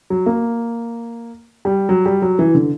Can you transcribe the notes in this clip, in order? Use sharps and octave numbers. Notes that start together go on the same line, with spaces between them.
F#3
A#3
G3
F#3
G3
F#3
E3
D3